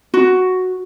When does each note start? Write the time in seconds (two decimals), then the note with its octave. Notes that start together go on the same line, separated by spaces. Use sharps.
0.14 F#4